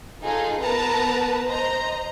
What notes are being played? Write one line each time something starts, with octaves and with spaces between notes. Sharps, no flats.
D#4 F4 G#4 A4
B3 A#4 B4 A5 A#5
C5 D#5 A#5